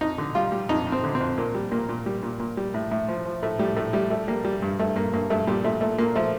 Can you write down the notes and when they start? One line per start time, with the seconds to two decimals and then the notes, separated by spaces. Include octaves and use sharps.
0.01 F2 D#4
0.18 D3
0.35 G3 F4
0.52 G3
0.69 F2 D#4
0.87 F2
0.92 C4
1.04 D3
1.15 C4
1.20 F2
1.38 A#2 A#3
1.55 G3
1.72 A#2 A#3
1.89 A#2
2.06 G3
2.23 A#2
2.40 A#2
2.57 G3
2.74 A2
2.91 A2
3.08 F3
3.25 F3
3.43 A2 A3
3.59 A2 G3
3.77 A2 A3
3.93 A2 G3
4.10 G3 A3
4.28 G3 A#3
4.45 G3
4.62 G2
4.79 G2 A3
4.96 G2 A#3
5.13 G2 A#3
5.30 G2 A3
5.47 A#2 G3
5.64 A#2 A3
5.81 A#2 A3
5.98 A#2 A#3
6.16 F3 A3